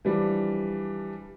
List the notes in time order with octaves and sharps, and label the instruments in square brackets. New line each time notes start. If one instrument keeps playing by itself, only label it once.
[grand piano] E3 F3 G3 D4